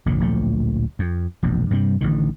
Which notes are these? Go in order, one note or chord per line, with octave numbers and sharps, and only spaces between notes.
F1 A#1 G#2 D3
D1 A#1 F3 A3
F2
E1 A#1 F#2
G2 C3 F3 G3
A1 D3 D#3